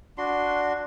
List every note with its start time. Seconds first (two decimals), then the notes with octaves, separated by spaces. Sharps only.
0.18 D4 F#4 C6